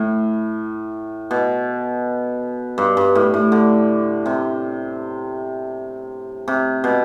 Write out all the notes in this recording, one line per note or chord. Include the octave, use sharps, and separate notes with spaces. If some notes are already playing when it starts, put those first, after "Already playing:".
Already playing: A2
B2
G2
G2
A2
A2
D3
C3
C3
B2